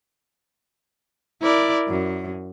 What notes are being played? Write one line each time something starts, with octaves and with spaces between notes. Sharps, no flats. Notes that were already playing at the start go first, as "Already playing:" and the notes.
E4 A#4 D5
F#2